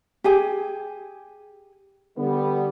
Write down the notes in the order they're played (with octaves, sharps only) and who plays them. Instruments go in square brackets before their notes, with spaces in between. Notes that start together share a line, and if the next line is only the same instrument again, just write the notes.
[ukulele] G4 G#4 G#5
[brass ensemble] D3 G3 B3